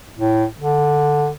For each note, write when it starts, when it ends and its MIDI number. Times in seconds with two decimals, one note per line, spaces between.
0.18 0.45 45
0.60 1.29 50